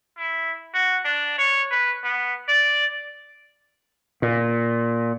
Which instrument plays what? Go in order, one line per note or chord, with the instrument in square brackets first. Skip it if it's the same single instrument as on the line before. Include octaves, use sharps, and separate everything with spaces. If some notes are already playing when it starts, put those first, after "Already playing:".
[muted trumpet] E4
F#4
D4
C#5
B4
B3
D5
[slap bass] A#2